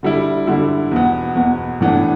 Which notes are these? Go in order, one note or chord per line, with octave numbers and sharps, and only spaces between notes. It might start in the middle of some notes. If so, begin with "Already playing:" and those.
D3 G3 E4
D3 G3 E4
E2 B2 B3
E2 B2 B3
A2 E3 B3 D4